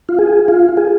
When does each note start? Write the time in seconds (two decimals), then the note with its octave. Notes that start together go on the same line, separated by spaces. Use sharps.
0.09 F4
0.19 G#4
0.48 F4
0.77 G#4